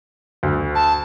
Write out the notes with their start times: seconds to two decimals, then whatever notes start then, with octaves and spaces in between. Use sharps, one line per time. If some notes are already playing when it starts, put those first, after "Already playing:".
0.43 D2
0.75 A5